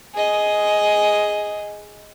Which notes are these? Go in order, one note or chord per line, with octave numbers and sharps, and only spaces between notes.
G#4 D#5